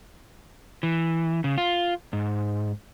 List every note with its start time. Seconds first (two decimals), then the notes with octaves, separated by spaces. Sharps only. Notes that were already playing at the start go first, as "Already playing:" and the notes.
0.83 E3
1.44 C#3
1.58 F4
2.13 G#2